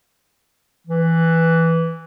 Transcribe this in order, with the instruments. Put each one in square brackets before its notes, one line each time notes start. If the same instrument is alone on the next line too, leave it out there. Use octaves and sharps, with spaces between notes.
[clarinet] E3